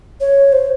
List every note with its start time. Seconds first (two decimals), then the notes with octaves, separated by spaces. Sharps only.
0.21 C#5
0.53 C5